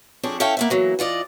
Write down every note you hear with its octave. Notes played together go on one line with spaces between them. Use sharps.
F2 C#4 D4 G#4
C#4 E4 A4 F5 G5
A#3 B3 E5
E3 F#3 A#3
E3 F4 D5 D#5